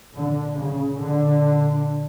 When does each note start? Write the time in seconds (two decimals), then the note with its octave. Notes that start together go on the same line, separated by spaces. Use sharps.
0.16 A#2 D3
0.58 C#3
1.00 A#2 D3